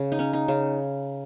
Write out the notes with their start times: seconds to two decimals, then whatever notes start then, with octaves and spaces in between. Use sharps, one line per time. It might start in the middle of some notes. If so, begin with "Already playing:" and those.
Already playing: C#3
0.12 D#4
0.19 C#4
0.33 D#4
0.48 C#3